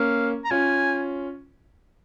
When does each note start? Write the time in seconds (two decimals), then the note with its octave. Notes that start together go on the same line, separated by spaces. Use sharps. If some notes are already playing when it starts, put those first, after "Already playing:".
Already playing: A#3 C#4 F5
0.45 A#5
0.51 C#4 F4 G#5